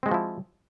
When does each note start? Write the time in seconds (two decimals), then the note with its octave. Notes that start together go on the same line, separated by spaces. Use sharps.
0.03 C4
0.06 G#3
0.09 F#4
0.11 F3
0.14 E4